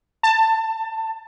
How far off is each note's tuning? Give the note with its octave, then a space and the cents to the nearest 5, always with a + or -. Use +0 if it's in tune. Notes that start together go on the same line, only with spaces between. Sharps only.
A5 +20